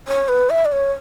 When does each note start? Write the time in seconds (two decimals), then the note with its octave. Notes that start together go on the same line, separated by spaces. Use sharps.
0.08 C#5
0.28 B4
0.50 E5
0.65 D5
0.72 C#5